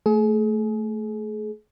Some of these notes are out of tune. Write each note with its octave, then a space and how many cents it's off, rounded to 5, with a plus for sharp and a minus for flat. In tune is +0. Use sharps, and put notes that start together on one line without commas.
A3 +0 G#4 +35